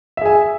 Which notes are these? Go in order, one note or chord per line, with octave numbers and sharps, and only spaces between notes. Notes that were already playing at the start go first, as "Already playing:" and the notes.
G#4 E5 G#5